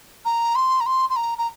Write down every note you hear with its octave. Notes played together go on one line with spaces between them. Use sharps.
A#5
C6
A#5
C6
C6
A#5
A#5